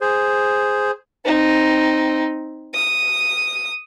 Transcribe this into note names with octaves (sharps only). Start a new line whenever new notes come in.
G#4 C5
C4 D#4
D#6